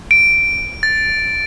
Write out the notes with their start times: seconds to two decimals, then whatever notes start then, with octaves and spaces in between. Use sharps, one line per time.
0.11 D7
0.83 A6